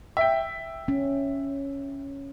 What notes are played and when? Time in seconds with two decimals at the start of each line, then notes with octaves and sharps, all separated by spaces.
0.17 E5 G5
0.88 C#4